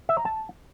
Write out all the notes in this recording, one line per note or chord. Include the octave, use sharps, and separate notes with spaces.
E5
A#5
A5